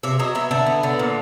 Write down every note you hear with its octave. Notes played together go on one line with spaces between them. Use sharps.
C3 E5
F#3 D#5
B3 E5
D3 E5
B3
D3
A#2